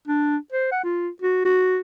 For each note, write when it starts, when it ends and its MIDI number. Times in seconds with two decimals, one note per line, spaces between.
0.07 0.36 62
0.52 0.70 72
0.72 0.80 78
0.84 1.08 65
1.22 1.43 66
1.45 1.78 66